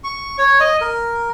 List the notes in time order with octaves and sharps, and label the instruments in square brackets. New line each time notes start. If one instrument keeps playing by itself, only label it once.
[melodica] C#6
C#5
D#5
A#4